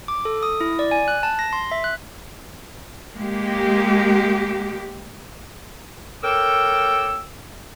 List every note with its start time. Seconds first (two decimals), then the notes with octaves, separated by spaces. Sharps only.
0.08 D6
0.25 A4
0.43 D#6
0.61 E4
0.79 D5
0.91 G#5
1.08 F#6
1.23 A5
1.39 A#6
1.53 C6
1.71 E5
1.84 F#6
3.16 G#3 A#3 G4
6.23 A4 A#4 C#5 G5 D6 E6